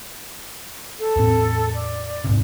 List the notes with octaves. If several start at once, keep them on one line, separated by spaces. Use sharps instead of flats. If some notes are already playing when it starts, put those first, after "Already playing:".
A4
E2 A2 C4
D5
E2 G#2 C3